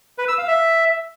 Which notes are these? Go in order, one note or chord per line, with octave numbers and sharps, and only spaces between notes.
B4
E6
F5
E5